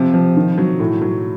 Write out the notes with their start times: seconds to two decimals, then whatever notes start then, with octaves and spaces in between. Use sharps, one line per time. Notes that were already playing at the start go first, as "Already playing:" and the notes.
Already playing: C3 F3
0.14 F3
0.37 D#3
0.58 F#3
0.80 A2
1.01 F#3